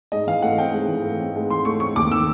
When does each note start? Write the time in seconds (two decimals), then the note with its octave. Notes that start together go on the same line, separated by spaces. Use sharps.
0.12 G#2 D#5
0.27 E3 F5
0.42 A3 F#5
0.58 C4 G5
0.74 G#2
0.89 E3
1.04 A3
1.19 C4
1.35 G#2
1.50 E3 C6
1.65 A3 C#6
1.80 C4 C#6
1.96 D#2 D6
2.11 D#3 E6